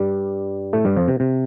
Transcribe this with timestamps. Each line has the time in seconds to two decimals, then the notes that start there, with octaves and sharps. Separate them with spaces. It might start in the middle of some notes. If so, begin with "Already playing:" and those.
Already playing: G2 G3
0.73 A2 A3
0.85 G2 G3
0.96 F2 F3
1.08 C3
1.20 C3